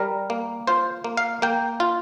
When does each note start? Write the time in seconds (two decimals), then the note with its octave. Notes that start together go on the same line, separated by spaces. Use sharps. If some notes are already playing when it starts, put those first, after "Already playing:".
Already playing: G3 A#4
0.30 A#3
0.67 F4 C5
1.04 A#3
1.17 F5
1.42 A#3 G5
1.80 F4